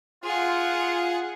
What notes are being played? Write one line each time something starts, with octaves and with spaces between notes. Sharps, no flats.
F4 G#4 F#5